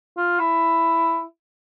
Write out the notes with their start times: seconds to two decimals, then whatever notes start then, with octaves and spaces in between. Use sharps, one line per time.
0.17 F4
0.40 E4